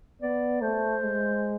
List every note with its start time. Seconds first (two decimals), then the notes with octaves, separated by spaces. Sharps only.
0.22 B3 D5
0.61 A3 C5
1.02 G#3